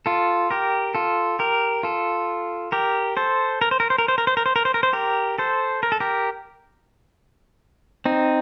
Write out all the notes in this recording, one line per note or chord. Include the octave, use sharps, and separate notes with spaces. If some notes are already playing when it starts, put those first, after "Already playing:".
F4 A4
G4 A#4
F4 A4
G4 A#4
F4 A4
G4 A#4
A4 C5
A#4
C5
A#4
C5
A#4
C5
A#4
C5
A#4
C5
A#4
C5
A#4
C5
G4 A#4
A4 C5
A#4
A4
G4 A#4
C4 D#4